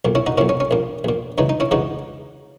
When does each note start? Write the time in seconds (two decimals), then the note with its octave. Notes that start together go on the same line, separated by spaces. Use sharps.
0.05 B1 A#2
0.15 C#4 E4
0.27 D#4 F#4
0.38 B1 A#2 C#4 E4
0.49 C#4
0.60 C#4
0.71 A#1 A#2
1.04 A#1 A#2
1.38 C#2 C#3 E3 D#4
1.49 D#4
1.60 C#4 E4
1.71 C#2 C#3 E3 D#4 F#4